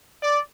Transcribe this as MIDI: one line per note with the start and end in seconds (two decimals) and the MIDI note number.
0.22 0.40 74